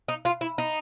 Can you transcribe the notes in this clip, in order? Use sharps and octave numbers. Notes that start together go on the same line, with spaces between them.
D#4
F4
E4
D#4